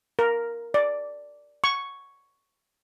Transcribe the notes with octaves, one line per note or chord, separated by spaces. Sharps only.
A#4
D5
C#6